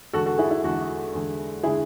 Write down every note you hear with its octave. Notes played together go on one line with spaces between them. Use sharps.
E2 D3 G#3 F#4 A4
F#4 A4
E4 G#4
E4
E2 D3 G#3 F#4
E2 D3 G#3
D3 G#3 E4 G#4